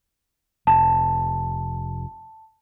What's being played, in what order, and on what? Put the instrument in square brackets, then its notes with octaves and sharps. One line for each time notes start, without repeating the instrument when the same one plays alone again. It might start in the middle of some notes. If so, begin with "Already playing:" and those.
[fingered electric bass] F1 [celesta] A5